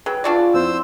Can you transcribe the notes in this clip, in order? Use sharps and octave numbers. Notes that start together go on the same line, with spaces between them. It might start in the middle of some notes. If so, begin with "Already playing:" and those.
F#3 G#4 B4 G5
D4 F4 F#4 D5
F2 C4 E4 C5 E6